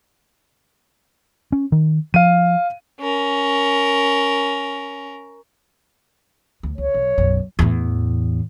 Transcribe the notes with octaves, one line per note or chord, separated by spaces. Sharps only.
C#4
D#3
F3 F5 D#7
C#4 A#4
D2
C#2 C#5
B1
B1 F#2
E2 A2